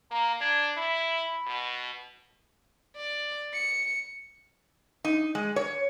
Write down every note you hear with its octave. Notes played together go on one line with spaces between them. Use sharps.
A#3 A#5
D4 G#6
E4 B5
B2
D5
C#7
D#4
G#3
C#5